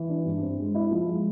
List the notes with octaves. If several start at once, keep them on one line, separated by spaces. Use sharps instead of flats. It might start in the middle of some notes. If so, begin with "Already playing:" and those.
Already playing: E3
D4
G2
C4
G#3
E4
F3
G#3